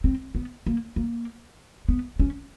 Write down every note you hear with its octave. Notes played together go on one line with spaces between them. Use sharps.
C4
B3
A#3
A#3
B3
C#4